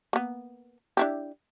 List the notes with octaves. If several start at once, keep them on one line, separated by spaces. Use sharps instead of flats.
A#3 B3
D4 E4 G4